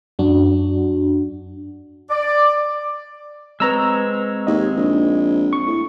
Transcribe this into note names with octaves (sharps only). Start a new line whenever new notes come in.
F#2 D4 F#4
D5
G#3 C4 B4 C#5 A#5 E6
D#2 D#5
A#1
C#6
A2